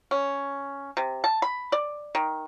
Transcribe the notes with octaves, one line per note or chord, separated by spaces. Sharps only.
C#4
C3
A5
B5
D5
D#3